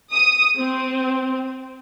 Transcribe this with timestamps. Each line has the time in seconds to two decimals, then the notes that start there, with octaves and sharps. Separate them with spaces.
0.13 D#6
0.59 C4